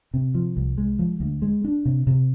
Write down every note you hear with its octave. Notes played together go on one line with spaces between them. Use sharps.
C3
F3
C2
G#3
F3
D2
G#3
D4
C3
C3